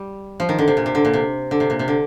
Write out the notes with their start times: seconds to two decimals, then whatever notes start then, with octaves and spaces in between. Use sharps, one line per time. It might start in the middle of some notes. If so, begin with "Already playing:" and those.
Already playing: G3
0.40 F3
0.49 D#3
0.59 D3
0.68 C3
0.77 A#2
0.86 C3
0.95 D3
1.05 A#2
1.13 C3
1.51 D3
1.60 C3
1.70 A#2
1.79 C3
1.88 D3